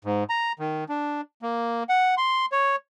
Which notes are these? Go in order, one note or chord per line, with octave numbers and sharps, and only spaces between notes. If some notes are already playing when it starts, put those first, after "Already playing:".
G#2
A#5
D#3
D4
A#3
F#5
C6
C#5